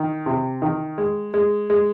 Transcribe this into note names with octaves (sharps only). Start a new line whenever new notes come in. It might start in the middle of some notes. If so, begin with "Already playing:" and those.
Already playing: D#3
C3
D#3
G#3
G#3
G#3